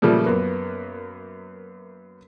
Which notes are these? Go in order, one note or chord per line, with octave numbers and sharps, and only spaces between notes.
A#2 C#3 F3 G3 A3
F#2 A#3 B3